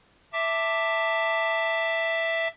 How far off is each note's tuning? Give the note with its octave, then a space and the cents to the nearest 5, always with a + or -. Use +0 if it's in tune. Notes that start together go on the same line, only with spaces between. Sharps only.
E5 +0 A5 +15 D6 +0